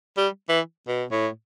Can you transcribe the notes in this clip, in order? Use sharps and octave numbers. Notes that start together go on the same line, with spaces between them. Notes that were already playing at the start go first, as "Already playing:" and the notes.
G3
E3
B2
A2